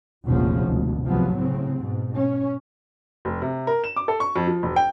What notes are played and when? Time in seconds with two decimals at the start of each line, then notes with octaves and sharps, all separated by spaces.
0.27 F1 A#1 E2 F3 F#3 C#4
0.68 G#1 D2 B2
1.05 C2 C3 F3 F#3 B3
1.36 A2 C#3 C4
1.80 G#2 B2
2.14 C#4
3.25 F1
3.42 C3
3.67 A#4
3.84 E7
3.96 D6
4.08 A4
4.20 C#6
4.36 F2
4.47 F3
4.63 E1
4.76 G5